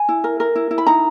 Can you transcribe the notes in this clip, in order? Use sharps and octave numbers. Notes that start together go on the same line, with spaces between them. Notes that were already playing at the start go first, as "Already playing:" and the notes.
Already playing: G#5
E4
A#4
A#4
E4
E4
B5
D#4 A#5